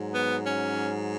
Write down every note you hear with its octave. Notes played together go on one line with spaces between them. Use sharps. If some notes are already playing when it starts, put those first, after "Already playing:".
Already playing: G#2 F#3
B3
C#4